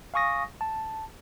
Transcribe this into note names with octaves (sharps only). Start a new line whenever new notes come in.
F5 G#5 C#6 D#6 A#6
A5